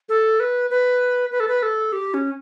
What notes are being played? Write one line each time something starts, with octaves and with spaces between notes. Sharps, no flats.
A4
B4
B4
B4
A4
B4
A4
G4
C#4